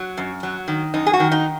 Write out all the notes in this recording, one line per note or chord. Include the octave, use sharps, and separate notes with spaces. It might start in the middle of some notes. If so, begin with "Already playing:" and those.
Already playing: F#3
F#2
F#3
D#3
F#2 D#4
G#4
F#4
D#3
D#4